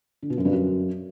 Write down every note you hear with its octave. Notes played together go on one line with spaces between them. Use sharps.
D3
B2
F#2
G2
F#2